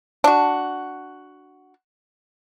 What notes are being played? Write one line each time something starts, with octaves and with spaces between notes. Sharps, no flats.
D4 F#4